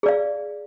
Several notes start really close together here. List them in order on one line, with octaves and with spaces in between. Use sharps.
G#4 D5 F5